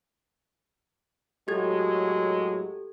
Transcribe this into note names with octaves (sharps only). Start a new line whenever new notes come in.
A2 F#3 G#3 G4 A4 G#6